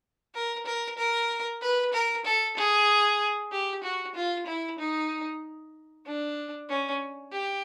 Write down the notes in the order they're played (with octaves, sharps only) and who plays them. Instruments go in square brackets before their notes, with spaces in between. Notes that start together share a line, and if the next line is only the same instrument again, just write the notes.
[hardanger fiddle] A#4
A#4
A#4
B4
A#4
A4
G#4
G4
F#4
F4
E4
D#4
D4
C#4
G4